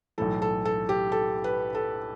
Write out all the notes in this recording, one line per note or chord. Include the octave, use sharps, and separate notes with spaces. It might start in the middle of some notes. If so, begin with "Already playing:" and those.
B1 A2 E3 A4
A4
A4
G4
A4
B4
A4